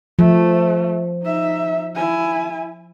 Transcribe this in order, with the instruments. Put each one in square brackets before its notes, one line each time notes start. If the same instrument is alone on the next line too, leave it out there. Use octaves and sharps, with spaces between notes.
[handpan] F3 [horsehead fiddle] A3
[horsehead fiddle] D#4 E5
E4 G#5